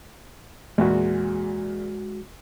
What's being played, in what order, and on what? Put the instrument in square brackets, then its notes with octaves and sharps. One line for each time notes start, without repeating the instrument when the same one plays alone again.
[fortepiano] E2 A#2 [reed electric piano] G#3 F#4